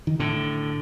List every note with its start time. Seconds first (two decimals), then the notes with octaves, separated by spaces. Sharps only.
0.07 D#3
0.20 A2 D3